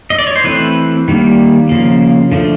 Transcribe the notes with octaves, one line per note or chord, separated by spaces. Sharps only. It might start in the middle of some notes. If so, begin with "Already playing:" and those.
D#5
D5
C#5
C5
E3 A3 C4 B4
D#3 G3 A#3
C#3 F3 A#3
D3 F3 A3